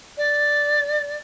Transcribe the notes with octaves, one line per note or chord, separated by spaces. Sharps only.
D5